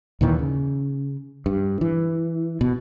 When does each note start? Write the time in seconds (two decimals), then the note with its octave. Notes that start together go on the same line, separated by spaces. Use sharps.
0.21 D#2 A#2 D#3 E3
0.39 C#3
1.46 G2
1.81 E3
2.61 B2